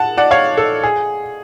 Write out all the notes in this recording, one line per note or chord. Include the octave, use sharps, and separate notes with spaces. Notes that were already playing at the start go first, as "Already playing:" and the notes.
Already playing: F#5 A5
D5 F#5
C#5 F5
A4
G#4